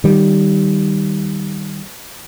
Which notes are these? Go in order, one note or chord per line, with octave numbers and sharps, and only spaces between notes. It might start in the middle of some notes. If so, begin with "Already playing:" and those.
D#3 G3